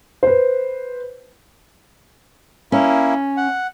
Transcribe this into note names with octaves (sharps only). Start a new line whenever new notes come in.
B4 C5
A#3 C#4 E4
F#5